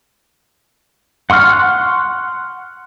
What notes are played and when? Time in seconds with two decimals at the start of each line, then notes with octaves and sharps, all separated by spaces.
1.30 F#5 C6 C#6 F6 F#6